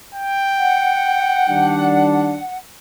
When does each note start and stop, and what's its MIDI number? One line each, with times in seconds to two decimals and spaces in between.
0.15 1.87 79
0.59 2.57 78
1.49 2.40 51
1.49 2.40 55
1.49 2.40 62